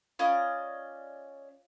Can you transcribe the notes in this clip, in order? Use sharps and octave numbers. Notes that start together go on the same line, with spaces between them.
C#4 F4 D5 D#5 F5 D#6